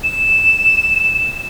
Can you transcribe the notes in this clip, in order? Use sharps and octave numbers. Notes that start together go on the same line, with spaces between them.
E7